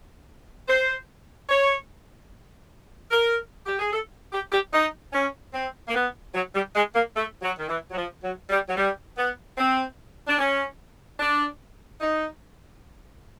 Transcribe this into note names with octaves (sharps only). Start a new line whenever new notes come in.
C5
C#5
A#4
G4
G#4
A4
G4
G4
D#4
C#4
C4
A#3
B3
F#3
G3
G#3
A#3
A3
F#3
D#3
E3
F#3
F3
F#3
G3
F#3
G3
B3
C4
D4
C#4
D4
D#4